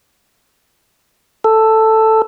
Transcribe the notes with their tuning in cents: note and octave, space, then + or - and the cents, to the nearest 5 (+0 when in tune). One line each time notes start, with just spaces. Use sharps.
A4 +5